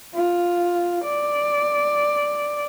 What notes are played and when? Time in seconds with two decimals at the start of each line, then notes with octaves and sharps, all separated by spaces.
0.14 F4
1.04 D5